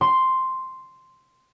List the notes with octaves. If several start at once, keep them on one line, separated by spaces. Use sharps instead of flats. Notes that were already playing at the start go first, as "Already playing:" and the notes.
C6